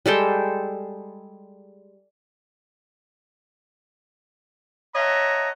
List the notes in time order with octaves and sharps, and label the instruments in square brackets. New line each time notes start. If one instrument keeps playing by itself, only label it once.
[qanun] G3 G#3 A4 G5
[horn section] C#5 D#5 E5 F#5 A5 A#5